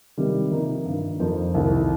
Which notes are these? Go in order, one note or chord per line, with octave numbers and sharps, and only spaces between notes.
C3 D#3 G3
C3 F3 A#3 D#4
G2 D#3 A#3
F2 F3 A#3 D#4 C5
C2 C3 D#3